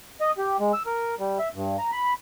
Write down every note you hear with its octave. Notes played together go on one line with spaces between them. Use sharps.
D#5
G4
G#3
E6
A#4
G3
E5
G2
A#5
B5